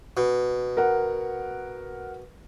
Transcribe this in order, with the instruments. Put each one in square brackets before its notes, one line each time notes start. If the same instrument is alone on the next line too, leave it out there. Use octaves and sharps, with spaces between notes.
[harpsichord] B2
[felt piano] A#4 F#5